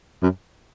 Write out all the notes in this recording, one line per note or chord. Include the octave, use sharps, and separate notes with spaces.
F#2